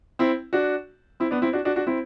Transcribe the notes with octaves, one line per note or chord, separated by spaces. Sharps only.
C4 E4
D4 F#4
C4 E4
B3 D4
C4 E4
D4 F#4
D4 F#4
D4 F#4
C4 E4